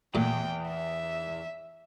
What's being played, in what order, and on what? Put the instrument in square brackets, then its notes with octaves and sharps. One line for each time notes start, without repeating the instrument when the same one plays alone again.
[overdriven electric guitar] E2 [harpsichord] A#2 A3 [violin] G5
[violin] E5